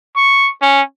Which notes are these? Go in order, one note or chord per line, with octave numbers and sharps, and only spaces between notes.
C#6
C#4